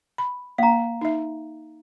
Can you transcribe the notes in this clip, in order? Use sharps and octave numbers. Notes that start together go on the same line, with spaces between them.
B5
A#3 F5 A#5
D#4 E5